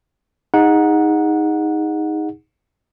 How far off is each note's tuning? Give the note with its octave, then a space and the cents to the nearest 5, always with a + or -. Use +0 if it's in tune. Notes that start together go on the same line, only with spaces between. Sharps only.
D#4 +10 G#4 -25 F#5 -15